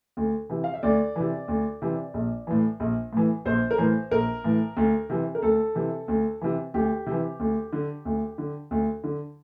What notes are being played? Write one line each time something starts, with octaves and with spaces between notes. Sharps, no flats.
D2
C3 E3
F5
E5
D2 D5
C3 E3
D2
C3 E3
A#1
A2 E3
A#1
A2 E3
A#1 C5
A#4
A2 E3 C5
A#1 A#4
A2 E3
D2
C3 E3
A#4
D2 A4
C3 E3
D2
C3 E3
D2 G4
C3 E3
D2
D3
D2
D3
D2
D3